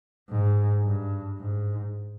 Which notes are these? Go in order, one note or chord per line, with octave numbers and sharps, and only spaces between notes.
G#2
G2
G#2